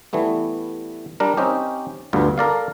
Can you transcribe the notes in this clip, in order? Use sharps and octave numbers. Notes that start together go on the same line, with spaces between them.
E3 G3 A3 B3
G3 D4 A#4
C4 C#4 D#4 G4
D2 G2 B3 F4
A4 A#4 D5 F5